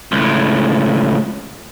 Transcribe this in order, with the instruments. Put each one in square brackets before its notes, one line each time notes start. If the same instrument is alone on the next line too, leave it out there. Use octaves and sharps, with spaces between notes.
[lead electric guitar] C#2 A2